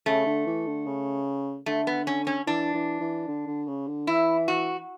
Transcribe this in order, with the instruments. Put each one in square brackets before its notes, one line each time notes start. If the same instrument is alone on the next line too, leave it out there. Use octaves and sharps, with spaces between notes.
[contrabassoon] C#3 [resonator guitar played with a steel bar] A3
[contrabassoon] D3
E3
D3
C#3
[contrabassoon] D3 [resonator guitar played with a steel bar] A3
[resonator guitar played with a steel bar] B3
C#4
C#4
[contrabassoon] E3 [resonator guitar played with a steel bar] D4
[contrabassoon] E3
E3
D3
D3
C#3
D3
[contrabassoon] E3 [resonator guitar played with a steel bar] E4
[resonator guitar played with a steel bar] F#4